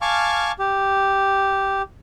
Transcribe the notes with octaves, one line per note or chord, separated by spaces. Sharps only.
F5 G#5 A5 C#6 D6 F6
G4